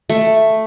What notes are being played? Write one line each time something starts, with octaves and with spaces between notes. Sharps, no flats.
A3